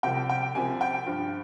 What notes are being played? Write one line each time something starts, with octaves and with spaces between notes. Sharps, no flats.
C2 C3 F3 G5
G5
C2 C3 F3 G#5
G5
G2 F3